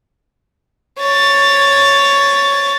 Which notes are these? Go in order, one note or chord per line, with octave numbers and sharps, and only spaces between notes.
C#5 A6